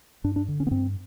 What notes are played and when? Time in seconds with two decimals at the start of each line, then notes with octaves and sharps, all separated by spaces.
0.24 G2 D4
0.36 D4
0.48 D3
0.60 C#4
0.67 B3
0.71 G2 C4